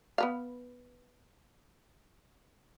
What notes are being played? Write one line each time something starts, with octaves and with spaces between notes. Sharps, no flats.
B3 B4 F5